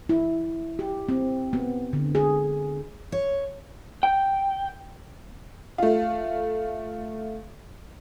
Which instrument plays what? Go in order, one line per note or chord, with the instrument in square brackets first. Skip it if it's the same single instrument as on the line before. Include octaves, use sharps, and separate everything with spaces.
[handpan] E4
G4
C4
B3
D3
G#4
[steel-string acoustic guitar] C#5
[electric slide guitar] G5
[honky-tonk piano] A3 F4